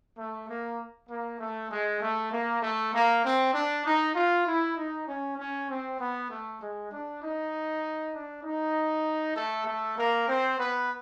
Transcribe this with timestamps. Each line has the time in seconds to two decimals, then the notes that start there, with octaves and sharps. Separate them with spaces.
0.16 A3
0.48 A#3
1.08 A#3
1.39 A3
1.70 G#3
2.00 A3
2.31 A#3
2.61 A3
2.92 A#3
3.23 C4
3.53 D4
3.84 D#4
4.14 F4
4.45 E4
4.75 D#4
5.06 C#4
5.37 C#4
5.68 C4
5.99 B3
6.29 A3
6.59 G#3
6.90 D4
7.21 D#4
8.12 D4
8.43 D#4
9.35 A3 A4
9.65 A3 A4
9.96 A#3 A#4
10.27 C4 C5
10.58 B3 B4